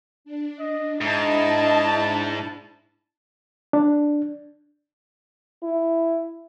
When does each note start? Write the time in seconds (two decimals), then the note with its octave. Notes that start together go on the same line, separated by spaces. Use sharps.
0.25 D4
0.59 D#5
1.01 G#2 E4 D#5 A5
3.73 D4
5.63 E4